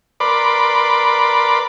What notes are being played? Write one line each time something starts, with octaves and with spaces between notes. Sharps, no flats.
A#4 B4 D5 B5 C6 D6